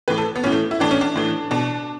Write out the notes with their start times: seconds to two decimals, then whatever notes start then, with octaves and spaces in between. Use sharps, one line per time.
0.08 A2 E3 B4
0.18 A4
0.36 B3
0.44 A2 E3 C#4
0.52 A3
0.71 E4
0.80 A2 E3 D4
0.91 C#4
1.01 D4
1.16 A2 E3
1.51 B2 D4